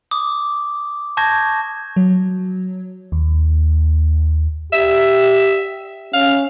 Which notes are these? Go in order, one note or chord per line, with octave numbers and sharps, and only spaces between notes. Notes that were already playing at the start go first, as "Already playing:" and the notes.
D6 D#6
A5 C#6 G6 G#6 A#6
F#3
D#2
G4 E5
C#4 F5